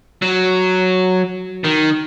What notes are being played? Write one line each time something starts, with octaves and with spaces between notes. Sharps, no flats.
F#3
D#3